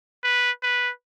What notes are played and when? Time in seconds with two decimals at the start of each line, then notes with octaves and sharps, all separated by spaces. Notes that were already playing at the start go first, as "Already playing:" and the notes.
0.24 B4
0.63 B4